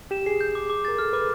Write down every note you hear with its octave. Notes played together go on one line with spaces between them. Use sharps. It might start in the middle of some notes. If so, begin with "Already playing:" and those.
G4 E7
G#4 C7
G6
D6
D6
A#4 A6
A4 F6
B4 D6